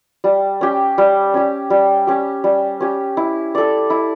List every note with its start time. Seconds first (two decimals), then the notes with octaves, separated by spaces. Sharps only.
0.24 G3
0.61 C#4 G4
0.98 G3
1.34 C#4 G4
1.70 G3
2.07 C#4 G4
2.44 G3
2.80 C#4 G4
3.17 E4
3.55 A4 D5
3.90 E4